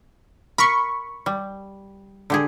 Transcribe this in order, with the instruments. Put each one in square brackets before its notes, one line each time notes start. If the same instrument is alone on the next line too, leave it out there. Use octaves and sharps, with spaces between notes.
[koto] A#4 [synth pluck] B5 C#6
[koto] G3
D3 G4 G#4